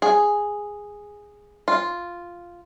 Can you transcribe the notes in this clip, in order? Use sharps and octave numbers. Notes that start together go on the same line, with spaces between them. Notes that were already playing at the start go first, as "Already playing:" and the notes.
G#4
F4